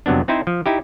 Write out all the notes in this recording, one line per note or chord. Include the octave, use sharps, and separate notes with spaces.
F2 C3 F#3 B3 D4
C4 D#4 E4 C5
F3
D#4 E4 G4